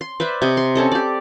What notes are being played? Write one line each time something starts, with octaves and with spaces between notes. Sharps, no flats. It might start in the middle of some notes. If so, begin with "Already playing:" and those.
C6
B4 C5 D5 E5
C3 D#5
C6
C4 C#4 A4 D#5
G4 D5